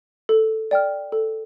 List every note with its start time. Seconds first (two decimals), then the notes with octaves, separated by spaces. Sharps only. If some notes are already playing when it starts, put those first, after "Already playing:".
0.29 A4
0.71 D5 G5 F6
1.12 A4